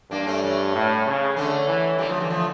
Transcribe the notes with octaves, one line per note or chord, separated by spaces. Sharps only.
G2 A#3 D4
A3 C#4
A3 C#4
A2
C#3
D3 A3 C#4
E3
D3 G3 A#3
F3 A3
E3 G3
F3 A3